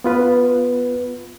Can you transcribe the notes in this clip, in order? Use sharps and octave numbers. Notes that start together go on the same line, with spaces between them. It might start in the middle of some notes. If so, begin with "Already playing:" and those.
B3 F4 B4